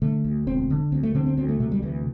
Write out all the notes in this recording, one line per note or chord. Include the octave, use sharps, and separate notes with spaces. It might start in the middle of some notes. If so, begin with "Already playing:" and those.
D3 A3
D2
E1 C4
D3
D2 C4
A3
D3 C4
C4
D2 C4
A3
C3 A3
G3
D2 E3